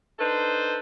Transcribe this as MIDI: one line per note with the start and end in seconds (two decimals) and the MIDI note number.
0.18 0.79 62
0.18 0.79 63
0.18 0.79 69
0.18 0.79 71
0.18 0.79 72